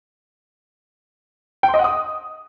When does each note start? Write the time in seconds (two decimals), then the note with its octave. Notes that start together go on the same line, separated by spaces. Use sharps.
1.63 G5
1.68 C6
1.74 D#5
1.79 F#5
1.84 D#6